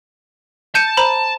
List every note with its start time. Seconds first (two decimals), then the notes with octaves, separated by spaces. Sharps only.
0.75 A5 G6 C#7 D#7
0.97 C5 A#5 B5